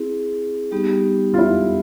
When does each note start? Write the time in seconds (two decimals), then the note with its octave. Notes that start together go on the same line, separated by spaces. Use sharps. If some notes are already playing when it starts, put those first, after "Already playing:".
Already playing: C4 E4 G#4
0.71 G3 B3 D#4 G4
1.34 F4
1.38 E4